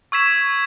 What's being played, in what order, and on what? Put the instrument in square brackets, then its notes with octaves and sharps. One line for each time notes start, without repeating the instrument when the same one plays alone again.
[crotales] C#6 E6 G#6 B6 E7